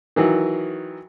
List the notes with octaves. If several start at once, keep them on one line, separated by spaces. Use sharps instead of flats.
D#3 E3 F#3